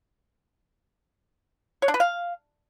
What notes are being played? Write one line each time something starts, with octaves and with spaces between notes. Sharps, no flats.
C#5
D4
B4
F5